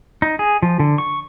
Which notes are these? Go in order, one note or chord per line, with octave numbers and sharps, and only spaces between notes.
D#4
G#4
F3
D3
C#6